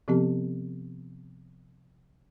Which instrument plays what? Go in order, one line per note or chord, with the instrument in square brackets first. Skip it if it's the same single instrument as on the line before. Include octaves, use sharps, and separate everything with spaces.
[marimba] C3 F3 B3 C4 G4